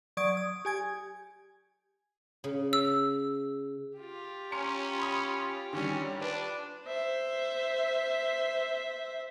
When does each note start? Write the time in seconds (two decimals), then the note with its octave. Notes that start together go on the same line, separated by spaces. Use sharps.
0.17 F#3 D5 C#6 D#6 G#6 D7
0.37 D#6
0.65 G4 G#5 G#6
2.44 C#3
2.73 E6
3.98 F4 G4
4.52 C#4 A#5 C6 C#7
4.99 B5 C6 D#6
5.73 D3 D#3 G3 C#4
6.21 D4 B4
6.85 C5 E5